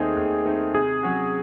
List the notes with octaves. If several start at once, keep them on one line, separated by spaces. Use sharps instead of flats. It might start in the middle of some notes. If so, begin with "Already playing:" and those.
Already playing: D#2 D#3 A3 C4 D#4 G#4
D#2
D#3 A3 C4 D#4
C3 G#4
F#3 C#4 F#4